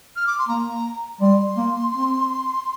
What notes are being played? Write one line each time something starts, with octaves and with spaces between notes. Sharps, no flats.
F6
D6
C6
A#3 A#5
G3 C6
A#3
C4